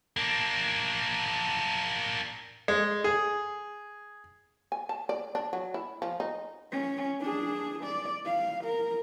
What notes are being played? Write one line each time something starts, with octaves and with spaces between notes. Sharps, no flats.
A#3 D4
G#3
G#4
G#5
A5
D5
D4
F#3
E4
F3
D#4
C#4
D4 G#4
D5
F5
A#4